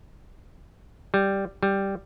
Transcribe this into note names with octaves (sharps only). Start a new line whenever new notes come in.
G3
G3